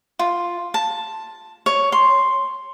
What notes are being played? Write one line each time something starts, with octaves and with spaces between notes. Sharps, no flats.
F4
A5
C#5
C6